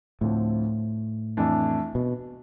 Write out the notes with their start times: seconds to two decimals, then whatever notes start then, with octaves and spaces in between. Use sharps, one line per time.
0.21 D2 A2 D3 F3 C4
1.37 F2 E3 A3 D4
1.95 B2